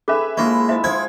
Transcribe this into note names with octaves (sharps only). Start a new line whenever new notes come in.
C#4 G#4 A4 B4 E5 G#5 D6
F3 G#3 A#3 D4 E4 D#5 C#6
E4 C5 D#5 E5
F3 E4 C5 C6 G#6